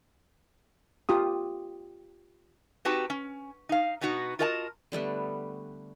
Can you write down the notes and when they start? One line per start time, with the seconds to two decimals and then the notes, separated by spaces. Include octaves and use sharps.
1.09 F4 G4 D#6
2.85 C4 D#4 F#4 G4 B4 A5
3.10 C#4
3.69 D#4 F5
4.01 B2 B3 D#4 F#4
4.39 F4 F#4 A#4 D#5 F#5 A5
4.92 D3 G3 A3 B3